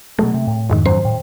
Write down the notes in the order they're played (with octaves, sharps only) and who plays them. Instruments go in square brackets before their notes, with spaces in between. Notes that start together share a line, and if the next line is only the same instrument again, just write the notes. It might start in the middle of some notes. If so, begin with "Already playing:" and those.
[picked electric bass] B2 F#3 G#3 [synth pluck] A3
[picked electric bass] C3
A2
[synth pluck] F2 G#2 D#3
[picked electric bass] F#2 F#3 C#4 [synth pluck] C5
[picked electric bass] A2